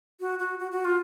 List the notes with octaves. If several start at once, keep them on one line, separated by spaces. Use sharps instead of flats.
F#4
F#4
F#4
F#4
F4